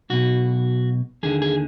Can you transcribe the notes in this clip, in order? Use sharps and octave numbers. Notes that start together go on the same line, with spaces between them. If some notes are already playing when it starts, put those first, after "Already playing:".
B1 B2 F#4
D#2 D3 G#4
G#4